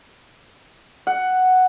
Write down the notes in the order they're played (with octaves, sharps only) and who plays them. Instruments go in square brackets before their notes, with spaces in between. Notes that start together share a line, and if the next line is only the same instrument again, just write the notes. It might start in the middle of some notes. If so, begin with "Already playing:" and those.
[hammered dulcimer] F#5